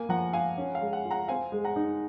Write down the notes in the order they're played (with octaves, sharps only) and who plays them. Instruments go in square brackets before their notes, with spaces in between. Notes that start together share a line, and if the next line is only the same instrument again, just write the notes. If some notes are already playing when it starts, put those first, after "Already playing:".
Already playing: [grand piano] A#3 [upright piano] G#5
[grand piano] F3 [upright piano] F#5 A#5
[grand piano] F4 [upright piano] F5 G#5
[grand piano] C#4
[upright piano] F5
[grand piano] G#3
[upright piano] F#5
[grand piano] F4
[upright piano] F#5 A#5
[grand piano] C4 [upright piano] F5 G#5
[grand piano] G#3
[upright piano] F#5 A#5
[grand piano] D#4